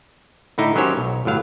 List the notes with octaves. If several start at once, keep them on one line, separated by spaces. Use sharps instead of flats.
A2 D3 D#4 E4
D#3 F#3 C#4 G4 C5 C#5
B1
G1 A2 F#3 F5